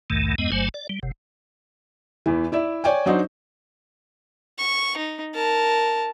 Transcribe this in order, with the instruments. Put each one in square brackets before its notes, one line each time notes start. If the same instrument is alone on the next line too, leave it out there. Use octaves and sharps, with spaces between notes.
[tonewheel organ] B1 E2 G#2 D#3 A3
E2 G2 G#3 B3 D#5
G1 G2 F#3 A3 C5 G#5
D5
G3
F#1 C3
[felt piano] E2 E3
E4 D5 E5
C#5 D5 G5 G#5
F#3 D4 D#4 F#4 C5
[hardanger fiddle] C#6
D#4
A#4 A5